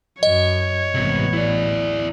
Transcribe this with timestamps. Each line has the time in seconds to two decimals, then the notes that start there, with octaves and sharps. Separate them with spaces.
0.23 F#2 C#5 D#5
0.95 A1 G#2 C3 B3
1.33 E4 D5